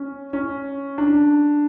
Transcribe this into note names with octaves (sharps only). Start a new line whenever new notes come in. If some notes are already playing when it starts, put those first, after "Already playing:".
Already playing: C#4
C#4
D4